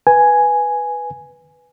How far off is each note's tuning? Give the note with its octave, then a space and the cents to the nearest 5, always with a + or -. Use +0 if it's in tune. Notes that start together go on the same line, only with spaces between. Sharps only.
B4 +0 G#5 +0